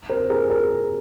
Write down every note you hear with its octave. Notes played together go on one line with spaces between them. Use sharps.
A#4 C5
G#4 A#4
G#4 A#4